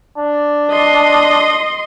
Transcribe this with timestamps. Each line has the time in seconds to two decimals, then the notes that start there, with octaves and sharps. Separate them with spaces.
0.18 D4
0.71 D#5 C6